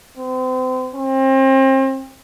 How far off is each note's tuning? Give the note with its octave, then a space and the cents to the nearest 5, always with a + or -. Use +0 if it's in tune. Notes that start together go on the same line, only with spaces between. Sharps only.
C4 -35
C4 +35